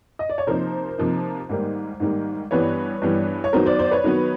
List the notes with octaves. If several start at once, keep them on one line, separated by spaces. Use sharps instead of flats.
D#5
D5
C#5
C3 F3 A#3 D#4 A#4 C5
C3 F3 A#3 D#4
G#2 D#3 G3 A#3
G#2 D#3 G3 A#3
G2 E3 G3 B3 B4 C#5
G2 E3 G3 B3
C#5
D#3 F#3 B3 A#4 C5
C5 D5
C5 D5
B4 C#5
D#3 F#3 B3